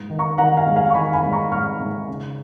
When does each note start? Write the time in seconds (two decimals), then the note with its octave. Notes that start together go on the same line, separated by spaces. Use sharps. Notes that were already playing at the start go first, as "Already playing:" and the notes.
Already playing: G#2
0.10 D#3
0.19 A#5 C#6
0.38 D#3 F#5 A#5
0.57 F5 G#5
0.66 G#2
0.76 F5 G#5
0.90 C#6
0.94 D#3 G#5 B5
1.13 G#5 B5
1.23 G#2
1.32 A#5 C#6
1.51 G#2 C#6 F6
1.80 G#2
2.08 C#3